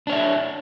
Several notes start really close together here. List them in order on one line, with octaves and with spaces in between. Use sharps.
D4 C#5 E5